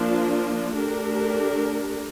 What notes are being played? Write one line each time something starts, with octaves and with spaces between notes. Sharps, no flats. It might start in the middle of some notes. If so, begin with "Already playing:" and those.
Already playing: F3 A#3 D4 F4
A3 D4 G4 A#4